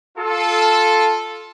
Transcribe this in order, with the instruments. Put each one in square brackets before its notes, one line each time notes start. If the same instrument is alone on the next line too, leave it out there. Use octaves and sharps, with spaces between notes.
[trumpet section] F4 A4